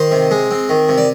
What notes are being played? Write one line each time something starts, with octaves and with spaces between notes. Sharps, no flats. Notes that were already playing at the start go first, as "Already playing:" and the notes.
Already playing: D#3 C5
C3
G#3
C4
D#3
C3
D5